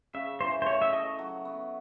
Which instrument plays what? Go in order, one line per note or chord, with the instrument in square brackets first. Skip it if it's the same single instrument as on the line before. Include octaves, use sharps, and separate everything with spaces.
[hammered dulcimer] C#3 [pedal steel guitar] E5
[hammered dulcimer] E3 [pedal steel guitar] C5
[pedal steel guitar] C5
[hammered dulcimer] A3 [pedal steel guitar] C#5
[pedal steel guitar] E5
[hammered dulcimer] A4 [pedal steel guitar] D#5
[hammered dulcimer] F#3
B3